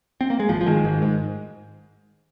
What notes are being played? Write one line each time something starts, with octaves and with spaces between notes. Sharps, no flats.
C4
A#3
G#3
G#1 F3
F3
G#1 D#3 G#3
G#2
G#2